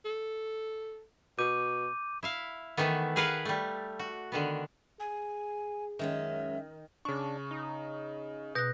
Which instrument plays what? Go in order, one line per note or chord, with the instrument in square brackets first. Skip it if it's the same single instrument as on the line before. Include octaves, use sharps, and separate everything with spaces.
[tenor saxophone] A4
[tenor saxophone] B2 [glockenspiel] D6 G6 D#7
[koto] E4 E5 F5
D#3 E3 A3 B3
G#4 A#4 B4 F5 F#5
G3 A3
F#4
D3 D#3 B3
[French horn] G#4 [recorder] G#5
[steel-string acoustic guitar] F#2 G#3 C#4 [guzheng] D#3 [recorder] E5
[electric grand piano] C#3 C#6 [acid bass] D4
[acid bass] D#4
[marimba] B2 F#6 [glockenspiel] G6 A#6